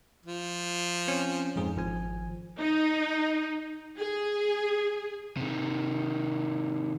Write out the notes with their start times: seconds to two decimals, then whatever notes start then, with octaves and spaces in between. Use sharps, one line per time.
0.26 F3
1.08 C4 C#4
1.56 F2 G#2 G#4
1.76 G#1 F3 G#5
2.57 D#4
3.98 G#4
5.37 C3 D#3